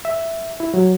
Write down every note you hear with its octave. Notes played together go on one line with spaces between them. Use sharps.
E5
E4
F#3